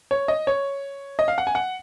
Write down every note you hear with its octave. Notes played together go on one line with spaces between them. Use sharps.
C#5
D#5
C#5
D#5
F5
F#5
G#5
F#5